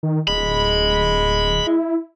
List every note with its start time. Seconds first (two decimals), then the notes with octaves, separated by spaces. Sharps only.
0.03 D#3
0.28 D1 G#3 B5
1.67 E4